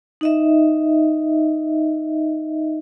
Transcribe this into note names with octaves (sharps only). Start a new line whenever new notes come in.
D#4 D#5 E5